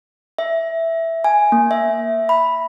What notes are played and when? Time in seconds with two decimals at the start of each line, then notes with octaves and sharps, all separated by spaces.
0.38 E5
1.24 G#5
1.52 A#3
1.71 E5
2.29 B5